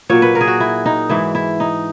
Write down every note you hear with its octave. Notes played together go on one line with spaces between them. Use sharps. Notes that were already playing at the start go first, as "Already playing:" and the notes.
A#2 F#3 C#5
B4
A#4
G#4
F#4
E4
D#4
G#2 E3 E4
E4
D#4